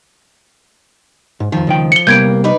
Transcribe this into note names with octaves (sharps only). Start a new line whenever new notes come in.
G#2
F2 D#3 F3
C#2 D#3 G5
C#7 G7
C3 G3 A#3 B3 G6 G#6 D7
D#4 B4 D5